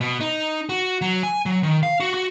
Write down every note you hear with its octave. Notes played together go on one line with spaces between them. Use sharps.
B2
D#4
F#4
F#3
G#5
F#3
D#3
F5
F#4
F#4